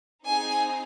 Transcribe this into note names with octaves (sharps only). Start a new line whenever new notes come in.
C4 D#4 G#4 G#5